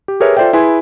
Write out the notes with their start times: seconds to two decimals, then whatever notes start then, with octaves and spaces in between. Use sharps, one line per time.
0.08 G4
0.20 G4 G#4 A#4 B4 C#5 E5
0.37 F4 A4 C5 D5 E5 G5
0.53 E4 G#4 B4 G#5 C6